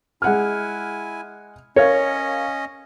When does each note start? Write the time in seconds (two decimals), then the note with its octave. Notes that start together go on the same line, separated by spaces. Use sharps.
0.22 G#3 E4 F#5 G#5 F6
1.76 C#4 A#4 C#5 D#5 F5